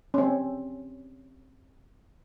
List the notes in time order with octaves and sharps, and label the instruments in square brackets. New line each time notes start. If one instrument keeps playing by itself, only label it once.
[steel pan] C4 C#4